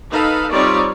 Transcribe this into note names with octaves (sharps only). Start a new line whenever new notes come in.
D#4 A4 B4 F5
G3 C4 D#4 F4 C#5 D5